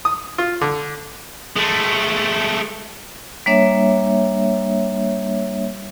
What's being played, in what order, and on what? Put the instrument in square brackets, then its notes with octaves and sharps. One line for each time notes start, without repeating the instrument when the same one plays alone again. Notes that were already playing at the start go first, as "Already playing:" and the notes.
[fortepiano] D#6
F4
D3
[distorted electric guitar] G#3 A3
[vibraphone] G3 A#3 D4 C#5 E5